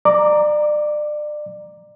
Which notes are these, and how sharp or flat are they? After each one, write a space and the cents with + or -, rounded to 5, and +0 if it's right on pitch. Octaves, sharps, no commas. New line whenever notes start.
D5 +30 A#5 +0 D6 +0